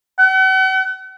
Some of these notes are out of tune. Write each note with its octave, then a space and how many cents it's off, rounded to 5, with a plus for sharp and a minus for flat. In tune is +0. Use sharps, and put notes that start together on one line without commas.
F#5 +40